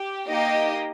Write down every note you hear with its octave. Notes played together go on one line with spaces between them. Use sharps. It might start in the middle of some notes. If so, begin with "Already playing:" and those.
Already playing: G4
A#3 D#4 G4 D#5